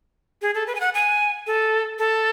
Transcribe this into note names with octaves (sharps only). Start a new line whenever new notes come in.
G#4
A4
B4
G#5
F#5
G#5
A4
A4